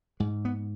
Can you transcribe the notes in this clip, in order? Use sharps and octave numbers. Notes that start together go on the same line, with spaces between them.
G#2 G#3
B3